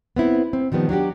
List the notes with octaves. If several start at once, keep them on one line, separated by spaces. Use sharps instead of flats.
B3 C4 E4
C4
D#3 F3 G3 B3
F#3 D4 F#4 G4